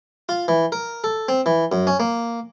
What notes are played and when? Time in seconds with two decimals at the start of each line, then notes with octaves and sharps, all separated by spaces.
0.29 F4
0.48 E3
0.72 A#4
1.04 A4
1.29 C4
1.46 E3
1.72 F#2
1.87 C#4
2.00 A#3